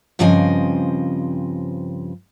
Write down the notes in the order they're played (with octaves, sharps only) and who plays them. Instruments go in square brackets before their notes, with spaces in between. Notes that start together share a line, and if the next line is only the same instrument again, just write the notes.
[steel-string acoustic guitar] G2 C#3 F3 C4 D#5 G#5